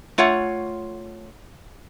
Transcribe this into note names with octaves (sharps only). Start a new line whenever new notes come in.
A3 F4 C#5 F#5